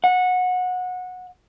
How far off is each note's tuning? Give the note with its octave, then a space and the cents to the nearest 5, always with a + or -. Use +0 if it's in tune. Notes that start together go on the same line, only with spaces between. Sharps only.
F#5 -20